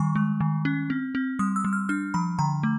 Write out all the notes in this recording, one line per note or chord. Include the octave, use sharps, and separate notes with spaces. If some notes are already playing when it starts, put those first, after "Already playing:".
Already playing: D#3 G3 C#6
G#3
D#3
C#4
C4
C4
G3 D#6
E6
G3
F6
D4 F6
F3 B5
D3 A#5
A3